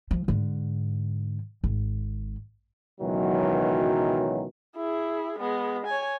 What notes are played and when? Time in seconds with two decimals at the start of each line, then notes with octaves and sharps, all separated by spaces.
0.11 F3
0.28 G#2 D3
1.64 G#1
3.00 C#2 B2 D#3 E3 F#3
4.76 E4 G#4
5.39 G#3 B3
5.87 C#5 G#5